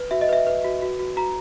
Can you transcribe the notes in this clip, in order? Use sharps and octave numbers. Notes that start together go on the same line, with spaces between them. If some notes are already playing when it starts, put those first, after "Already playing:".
Already playing: B4
F#4 E5
D#5
B4 E5
B4
F#4
F#4
F#4
F#4 A#5